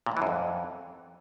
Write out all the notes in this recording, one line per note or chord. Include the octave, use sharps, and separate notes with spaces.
A#2
A2
E3
F#2
F2